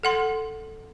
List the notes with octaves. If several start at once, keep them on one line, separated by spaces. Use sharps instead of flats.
A4 F#5 C6